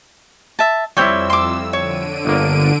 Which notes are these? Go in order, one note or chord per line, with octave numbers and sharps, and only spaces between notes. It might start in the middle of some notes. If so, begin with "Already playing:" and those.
E5 A5
F2 G3 C4 E4 C#5 G5 E6
C6 D6
D3 C#5 D7 D#7
G1 A#3